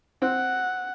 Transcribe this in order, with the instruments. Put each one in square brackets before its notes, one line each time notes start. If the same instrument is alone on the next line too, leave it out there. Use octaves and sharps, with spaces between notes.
[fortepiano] C4 [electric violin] F#5